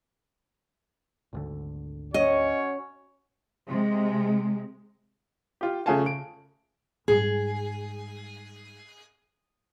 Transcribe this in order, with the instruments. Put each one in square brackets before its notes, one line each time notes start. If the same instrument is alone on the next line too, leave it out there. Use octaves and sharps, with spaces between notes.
[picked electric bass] G#1 D2 D3
[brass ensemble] C#4 F#4 C#5 [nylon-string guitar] D#5
[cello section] C3 G#3
[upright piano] F4 G4
F2 C#3 A3 F5 G#5 A5
D7
[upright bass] G#2 G3 [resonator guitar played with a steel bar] G#4